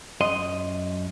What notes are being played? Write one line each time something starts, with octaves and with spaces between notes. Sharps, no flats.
F#2 D#5 C6